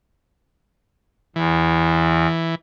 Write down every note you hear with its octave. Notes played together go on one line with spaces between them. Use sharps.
E2 E3